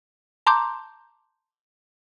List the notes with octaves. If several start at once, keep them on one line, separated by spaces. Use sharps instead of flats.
A5 A#5 C6 D6 G6